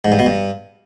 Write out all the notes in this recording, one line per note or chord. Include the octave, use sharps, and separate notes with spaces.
G#2
G2
B2
G2